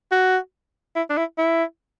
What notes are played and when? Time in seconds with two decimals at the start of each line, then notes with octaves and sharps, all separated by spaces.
0.12 F#4
0.95 E4
1.10 D4
1.17 E4
1.38 E4